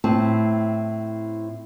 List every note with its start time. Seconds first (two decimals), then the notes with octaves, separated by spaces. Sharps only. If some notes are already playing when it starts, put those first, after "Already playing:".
0.04 A2 C4 E4 A5